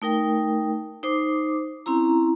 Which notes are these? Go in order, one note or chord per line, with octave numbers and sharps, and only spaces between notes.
A3 D#4 A#4 G5
D#4 C5 D6
C4 C#4 E4 A#5